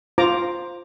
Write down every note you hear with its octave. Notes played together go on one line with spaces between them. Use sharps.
F4 C5 A#5 D6